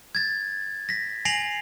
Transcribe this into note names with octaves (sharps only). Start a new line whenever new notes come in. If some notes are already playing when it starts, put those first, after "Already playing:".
G#6 A6
A#6 B6
G#5 A#6 C7 D7 F7 F#7